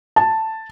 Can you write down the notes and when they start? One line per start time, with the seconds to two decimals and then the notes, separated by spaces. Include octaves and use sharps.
0.16 A5